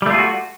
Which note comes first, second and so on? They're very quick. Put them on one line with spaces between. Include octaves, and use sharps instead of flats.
G3 A3 F4 G#4 F#4